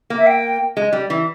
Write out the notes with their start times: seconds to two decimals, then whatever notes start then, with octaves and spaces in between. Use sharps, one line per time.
0.10 A#3
0.18 E5
0.27 G5
0.77 G#3
0.93 G3
1.10 E3